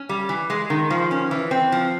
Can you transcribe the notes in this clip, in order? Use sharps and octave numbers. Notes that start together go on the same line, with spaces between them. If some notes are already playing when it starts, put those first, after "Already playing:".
Already playing: C#4
G3
E3
G#3
D#3
F3
C#4
E3
C4
F3